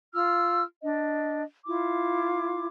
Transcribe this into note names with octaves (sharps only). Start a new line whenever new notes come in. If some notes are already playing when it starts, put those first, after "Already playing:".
F4 E6 F6
D4 D#5
E4 F4 D6